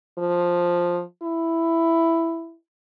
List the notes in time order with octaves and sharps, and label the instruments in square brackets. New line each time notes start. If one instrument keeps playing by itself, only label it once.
[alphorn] F3
E4